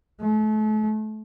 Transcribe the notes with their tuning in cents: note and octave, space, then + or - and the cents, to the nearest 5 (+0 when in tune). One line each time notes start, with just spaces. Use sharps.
A3 -35